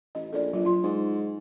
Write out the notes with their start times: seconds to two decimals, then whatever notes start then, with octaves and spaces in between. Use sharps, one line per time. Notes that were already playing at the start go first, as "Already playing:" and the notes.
0.15 A1 D#5
0.33 A#1 A4 D5
0.53 F#3 F4
0.65 F4 C6
0.83 G#2